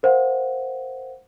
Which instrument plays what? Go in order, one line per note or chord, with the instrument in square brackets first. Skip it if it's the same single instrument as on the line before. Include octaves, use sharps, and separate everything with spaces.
[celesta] A#4 C5 F5 F#5